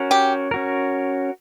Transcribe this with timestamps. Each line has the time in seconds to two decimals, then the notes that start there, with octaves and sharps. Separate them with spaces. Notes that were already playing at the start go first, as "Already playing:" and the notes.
Already playing: C#4 F#4 A#4
0.11 G4
0.51 C#4 F#4 A#4